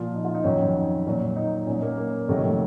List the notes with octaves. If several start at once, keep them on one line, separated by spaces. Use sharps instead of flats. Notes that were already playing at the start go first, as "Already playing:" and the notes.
Already playing: A#2 F3 F4
D#4
F4
D#4
F2 D#3 F#3 C#4
A#2 F#3
D#4
A#2 F#3 C#4
A#3
A#3
F2 C3 D#3 F#3 A3